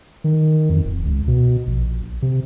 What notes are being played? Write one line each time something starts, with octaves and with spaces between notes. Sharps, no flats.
D#3
F2
D1
C#2
B2
A#1
C3